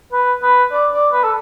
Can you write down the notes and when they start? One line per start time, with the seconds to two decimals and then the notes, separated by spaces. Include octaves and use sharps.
0.12 B4
0.42 B4
0.72 D5
0.93 D5
1.12 B4
1.24 A4